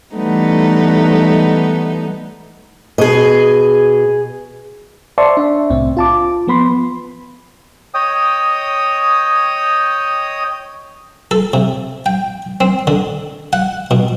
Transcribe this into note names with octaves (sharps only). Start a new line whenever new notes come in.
E3 G3 A3 B3 D#4
B2 G#4 D#5
C5 D5 E5 A5 C6 C#6
D4 E5
C2 A2 C4
F4 A5 D6
F3 B3 B5 C6
C#5 D#5 G5 D#6
A4
C3
G5
C4
D3
F#5
B2